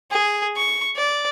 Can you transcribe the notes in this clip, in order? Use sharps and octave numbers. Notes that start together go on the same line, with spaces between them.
G#4
C#6
D5